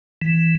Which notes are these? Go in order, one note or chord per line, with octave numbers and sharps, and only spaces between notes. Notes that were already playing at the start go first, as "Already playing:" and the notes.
E3